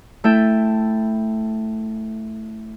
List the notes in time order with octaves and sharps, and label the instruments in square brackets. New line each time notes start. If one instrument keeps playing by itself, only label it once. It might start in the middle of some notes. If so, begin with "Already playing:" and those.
[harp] A3 E4 A4 E5 G5